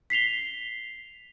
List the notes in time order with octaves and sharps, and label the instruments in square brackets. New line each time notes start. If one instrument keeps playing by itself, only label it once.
[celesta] B6 C7 F7 G7